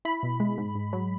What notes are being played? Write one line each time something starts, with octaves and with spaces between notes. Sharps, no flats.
E4 B5
B2
G#3
G#2
G#2
F#3